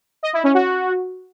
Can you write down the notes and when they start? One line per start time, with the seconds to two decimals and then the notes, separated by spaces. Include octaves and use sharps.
0.23 D#5
0.33 E4
0.44 C#4
0.54 F#4